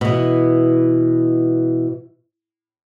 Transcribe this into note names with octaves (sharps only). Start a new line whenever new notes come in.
B2 E3